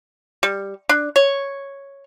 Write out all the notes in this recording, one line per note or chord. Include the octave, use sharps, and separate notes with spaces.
G3
D4
C#5